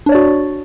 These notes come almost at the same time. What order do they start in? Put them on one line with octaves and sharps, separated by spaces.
D4 C#5 D5 F#4